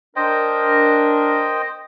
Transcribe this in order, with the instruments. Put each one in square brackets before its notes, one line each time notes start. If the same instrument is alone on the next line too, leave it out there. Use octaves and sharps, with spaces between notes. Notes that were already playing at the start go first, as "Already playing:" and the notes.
[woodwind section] D4 A#4 [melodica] C5 D#5 G5